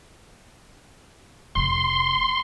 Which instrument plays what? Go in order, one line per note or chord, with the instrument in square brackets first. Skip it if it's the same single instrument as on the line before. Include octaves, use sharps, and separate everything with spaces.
[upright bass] F1 E3 [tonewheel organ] C6